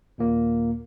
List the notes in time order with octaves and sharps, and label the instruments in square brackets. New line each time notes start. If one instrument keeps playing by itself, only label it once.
[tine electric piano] D#2 A#2 A#3